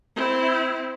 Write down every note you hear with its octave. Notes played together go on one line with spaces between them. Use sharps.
C4 E4